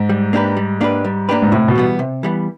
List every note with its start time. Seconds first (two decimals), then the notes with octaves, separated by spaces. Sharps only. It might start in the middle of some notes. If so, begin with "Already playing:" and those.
Already playing: G#2
0.09 G3
0.33 A#3 D4 G4 B4
0.57 G3
0.81 A#3 D4 G4 B4
1.04 G3
1.29 A#3 D4 G4 B4
1.42 G#2
1.52 A2 C3
1.68 B2
1.75 E3 G3 B3
1.99 C3
2.23 E3 G3 B3